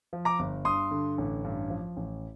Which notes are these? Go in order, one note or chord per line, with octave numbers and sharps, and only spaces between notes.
F3
A#5 D6
G1
G2 C6 D#6
D3
A1
G2
F3
A1